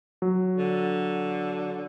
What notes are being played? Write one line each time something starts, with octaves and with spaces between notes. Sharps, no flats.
F#3
D3